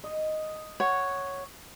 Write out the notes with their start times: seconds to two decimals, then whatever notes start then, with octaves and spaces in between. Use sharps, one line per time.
0.04 D#5
0.80 C#5 F#5